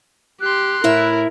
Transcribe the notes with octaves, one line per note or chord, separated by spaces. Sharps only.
G4 C6 F#6
A2 E4 A#4 E5